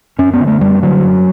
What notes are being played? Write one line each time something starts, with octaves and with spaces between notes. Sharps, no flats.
F#2 C#4
B3
D3
A3
F#2 G3
D3 F#3
F#2